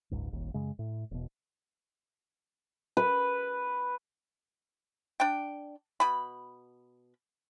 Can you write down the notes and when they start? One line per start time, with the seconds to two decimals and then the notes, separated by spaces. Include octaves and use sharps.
0.11 F#1 C#2 G#2
0.31 D#1 G#1 D#2
0.54 F#2 C#3 G#3
0.79 A2
1.11 E1 B2
2.97 B4
5.20 D4 G5
6.00 B2 B5